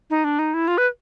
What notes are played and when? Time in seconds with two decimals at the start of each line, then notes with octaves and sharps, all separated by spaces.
0.10 D#4
0.24 D4
0.39 D#4
0.54 E4
0.68 F4
0.78 B4